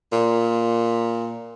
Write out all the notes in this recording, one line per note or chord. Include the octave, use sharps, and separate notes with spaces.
A#2